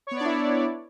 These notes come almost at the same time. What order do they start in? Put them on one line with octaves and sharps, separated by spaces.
C#5 B3 D5 D4 E4